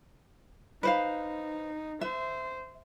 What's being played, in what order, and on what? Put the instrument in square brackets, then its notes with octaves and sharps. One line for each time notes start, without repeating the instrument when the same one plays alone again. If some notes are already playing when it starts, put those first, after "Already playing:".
[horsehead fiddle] D#4 [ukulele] B4 C5 F5
[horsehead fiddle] C5 [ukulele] E5